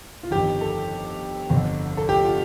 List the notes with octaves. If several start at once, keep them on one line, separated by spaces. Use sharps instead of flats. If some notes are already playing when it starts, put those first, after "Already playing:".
F4
G1 F2 D#3 G4
A4
G1 F2 D3
A4
G4
F4